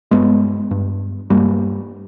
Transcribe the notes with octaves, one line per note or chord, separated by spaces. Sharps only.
G2 G#3 B3
G2
G2 G3 A#3